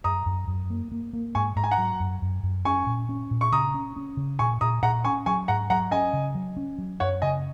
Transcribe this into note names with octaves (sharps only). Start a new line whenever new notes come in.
F#2 A#5 D#6
F#2
F#2
A#3
A#3
A#3
G#2 G#5 C#6
G#2 A#5
G#5
F#5 A#5
F#3
F#2
F#2
F#2
C#4 G#5 C#6
A#2
C#4
A#2
C#6
C#3 A#5 D#6
C#4
C#4
C#3
A#2 G#5 C#6
A#2 A#5 D#6
A#2 F#5 A#5
C#4 G#5 C#6
F#3 G#5 C#6
G#2 F#5 A#5
F#3 F#5 A#5
C#4 D#5 G#5
C#3
F#3
C#4
F#3
F#2 C#5 F#5
C#3 D#5 G#5